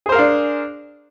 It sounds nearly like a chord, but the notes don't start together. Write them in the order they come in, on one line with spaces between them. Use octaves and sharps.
G#4 C5 A#4 F5 D4